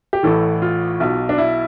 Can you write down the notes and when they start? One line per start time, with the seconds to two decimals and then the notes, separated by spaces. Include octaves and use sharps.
0.13 G4
0.23 A1 A2 E3 A4
0.62 F4
1.00 B1 B2
1.29 D4
1.38 E4